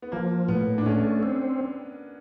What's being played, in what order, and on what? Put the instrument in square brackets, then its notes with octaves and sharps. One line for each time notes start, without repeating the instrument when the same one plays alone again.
[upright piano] B3
[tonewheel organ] F3 [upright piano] A#3
[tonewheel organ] A2 [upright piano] B3
[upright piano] D4
[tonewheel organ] A3 [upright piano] C#4
[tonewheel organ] C4